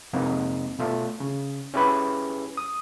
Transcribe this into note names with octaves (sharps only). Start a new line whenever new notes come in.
F2 C3 G#3 A#3 C4 D#4
B2 A3 F4
C#3
C#4 E4 G4 G#4 B4 B5
D#6